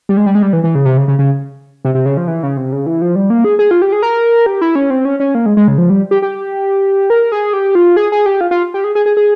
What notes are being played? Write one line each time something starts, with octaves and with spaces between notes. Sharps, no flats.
G3
G#3
G3
G#3
G3
E3
E3
C#3
C3
C#3
C#3
C#3
C3
C3
C#3
F3
E3
C#3
C3
C#3
E3
F3
G3
A#3
G#4
G#4
F4
G4
G#4
A#4
G4
E4
C#4
C4
C#4
C#4
A#3
G#3
G#3
C#3
F3
G3
G4
G4
A#4
G#4
G4
F4
G#4
G#4
G4
F4
F4
G4
G#4
G#4
G#4
G#4